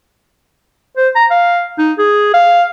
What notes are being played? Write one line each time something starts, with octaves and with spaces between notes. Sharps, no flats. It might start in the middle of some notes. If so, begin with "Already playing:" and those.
C5
A#5
F5
D#4
G#4
F5